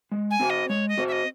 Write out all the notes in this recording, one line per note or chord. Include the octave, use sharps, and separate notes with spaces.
G#3
G#5
C4 F#4 C5
D#5
G#3 C#5
D#5
C4 F#4 C5
E5
D#5